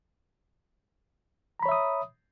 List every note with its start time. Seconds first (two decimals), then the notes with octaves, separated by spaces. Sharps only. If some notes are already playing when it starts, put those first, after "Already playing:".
1.59 A#5
1.63 B5
1.66 C#5
1.69 E5
1.72 D#6